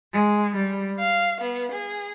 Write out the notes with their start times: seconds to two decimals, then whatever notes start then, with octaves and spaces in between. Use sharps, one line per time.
0.13 G#3
0.55 G3
0.97 F5
1.40 B3
1.71 G#4